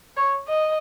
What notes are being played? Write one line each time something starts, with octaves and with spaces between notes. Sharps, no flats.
C#5
D#5